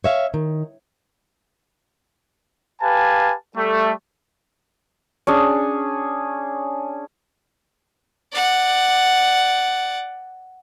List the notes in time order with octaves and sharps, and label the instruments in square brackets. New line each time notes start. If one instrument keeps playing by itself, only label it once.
[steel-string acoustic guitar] C#5 E5 F5
D#3
[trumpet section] G4 B4 F5 G#5 A5
G3 A3
[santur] C#4 D4 G#4
[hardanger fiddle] D5 F#5